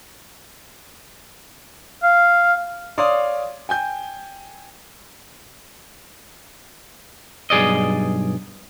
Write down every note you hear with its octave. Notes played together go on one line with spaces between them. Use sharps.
F5
C#5 D5 F5 C6 D6 D#6
G5 G#5 G6
B1 G2 G#4 D5 D#5